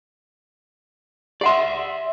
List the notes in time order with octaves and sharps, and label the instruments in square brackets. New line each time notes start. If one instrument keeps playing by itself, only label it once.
[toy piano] G4 F#5 C6 [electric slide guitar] D5 E5